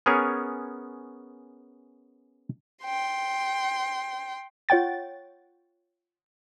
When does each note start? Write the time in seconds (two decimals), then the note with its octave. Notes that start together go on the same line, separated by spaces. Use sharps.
0.06 B3 C#4 G#4 A#4 C#5
2.84 G5 C6
4.69 F4 C#5 F#5 G5 A6